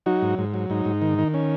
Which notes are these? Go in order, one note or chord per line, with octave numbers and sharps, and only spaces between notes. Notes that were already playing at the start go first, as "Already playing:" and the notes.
F#3 D#4 F#4
G#2
G#2
F#3
G#2 D#4
G#2
D#3
D#3
C#4